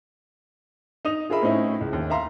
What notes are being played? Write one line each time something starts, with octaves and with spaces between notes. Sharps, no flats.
D#4 D#6 F7
F4 G#4 A#4 E5 B5
A2 C4 C#4 D#4 E4
C#2
D#2
E5 F5 A#5 C6